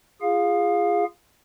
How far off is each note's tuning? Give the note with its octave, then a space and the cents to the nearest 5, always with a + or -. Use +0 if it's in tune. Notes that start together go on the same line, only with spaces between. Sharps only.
F4 -30 G#4 -20 F5 +15